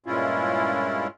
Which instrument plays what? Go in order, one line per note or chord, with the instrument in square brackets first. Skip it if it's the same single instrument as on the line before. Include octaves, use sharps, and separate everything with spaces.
[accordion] G2 A#2 G#3 C#4 E4 F4